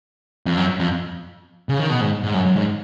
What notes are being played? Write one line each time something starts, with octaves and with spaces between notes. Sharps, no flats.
F2
F#2
F2
C#3
D#3
B2
G#2
G#2
F#2
F#2
G#2